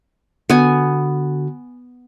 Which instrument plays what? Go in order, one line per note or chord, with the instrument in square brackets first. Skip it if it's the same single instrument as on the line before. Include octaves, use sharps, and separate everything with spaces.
[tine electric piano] D3 F#4 [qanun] B3 G#5